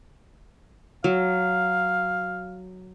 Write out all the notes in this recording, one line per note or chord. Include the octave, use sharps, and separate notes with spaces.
F#3 F5